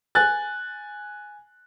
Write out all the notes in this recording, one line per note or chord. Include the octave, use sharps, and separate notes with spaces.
G#5 F#6 A6